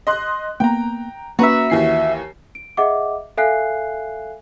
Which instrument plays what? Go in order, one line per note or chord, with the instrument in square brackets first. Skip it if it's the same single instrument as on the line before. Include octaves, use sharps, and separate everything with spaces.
[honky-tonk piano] D#5 C6 F#6
[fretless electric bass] A#3 B3 [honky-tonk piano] G5 A#5
[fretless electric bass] A#3 C#4 [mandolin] F#4 E5 [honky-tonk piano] B4 A#5
[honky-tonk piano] D#2 E3 C7
[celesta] D7
G#4 D#5 E5 F#5 D6
A4 E5 F5 G#5 F#6 C7